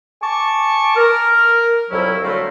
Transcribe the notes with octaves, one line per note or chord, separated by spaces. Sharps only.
G#5 A5 C#6 D6
A#4
C2 F2 F#3 C#4 E4
D3 F#3 G3 A3 A#3 C4